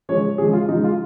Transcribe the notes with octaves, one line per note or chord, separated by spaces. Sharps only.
C#3 F3 G#3 C#5
C#3 F3 G#3 G#4
F4
C#3 F3 G#3 D#4
F4